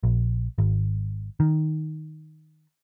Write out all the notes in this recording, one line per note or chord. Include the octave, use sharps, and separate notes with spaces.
A#1
G#1
D#3